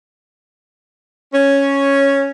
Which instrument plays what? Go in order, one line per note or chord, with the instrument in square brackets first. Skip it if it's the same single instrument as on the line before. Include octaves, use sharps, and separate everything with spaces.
[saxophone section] C#4